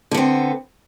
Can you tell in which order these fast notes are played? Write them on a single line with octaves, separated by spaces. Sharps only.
D3 B3 C4